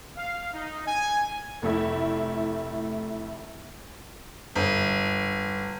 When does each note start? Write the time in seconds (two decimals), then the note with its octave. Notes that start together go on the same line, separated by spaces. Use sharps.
0.17 F5
0.54 D#4
0.86 G#5
1.62 F1 A3 E4
4.55 G1